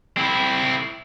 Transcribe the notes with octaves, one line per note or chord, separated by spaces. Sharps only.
C4 E4